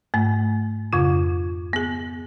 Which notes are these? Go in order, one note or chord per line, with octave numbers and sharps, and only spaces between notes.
G#2 A3
F2 C#3 F4
B3 G#4